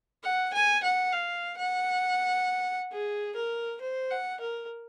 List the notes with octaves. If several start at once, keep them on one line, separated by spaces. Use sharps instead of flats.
F#5
G#5
F#5
F5
F#5
G#4
A#4
C5
F#5
A#4